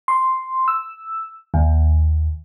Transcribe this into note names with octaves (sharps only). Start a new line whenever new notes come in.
C6
E6
D#2